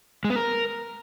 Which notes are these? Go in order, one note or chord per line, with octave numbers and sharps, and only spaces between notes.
G#3
B3
A#4